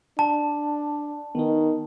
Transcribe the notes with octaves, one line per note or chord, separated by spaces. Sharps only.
D4 A5
D#3 B3 D#4